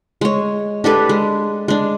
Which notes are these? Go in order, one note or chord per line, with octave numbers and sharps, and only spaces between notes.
G#3 C#5
D4 G4 A4 B4
G#3
G#3 D4